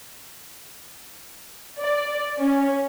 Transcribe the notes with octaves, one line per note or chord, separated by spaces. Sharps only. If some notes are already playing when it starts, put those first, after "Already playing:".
D5
C#4